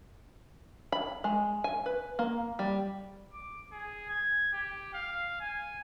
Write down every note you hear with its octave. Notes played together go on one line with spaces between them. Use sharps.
B5
G#3
G#5
B4
A#3
G3
D6
G#4
G#6
G4
F5
G#5